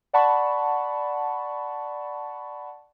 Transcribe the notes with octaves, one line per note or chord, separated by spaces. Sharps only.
D5 F#5 A5 B5 C#6